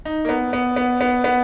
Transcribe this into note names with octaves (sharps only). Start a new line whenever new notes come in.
D#4
A#3
B3
B3
B3
B3
B3